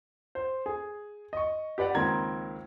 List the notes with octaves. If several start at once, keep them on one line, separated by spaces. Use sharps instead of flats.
C5
G#4
D#5 C#6
G4 B4 D5 F#5
C#2 D#3 A#3 C4 A#5 G#6